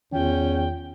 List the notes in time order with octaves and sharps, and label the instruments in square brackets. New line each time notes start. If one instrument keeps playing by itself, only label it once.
[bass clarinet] E2 [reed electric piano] D#3 F4 [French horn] C#4 [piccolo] G5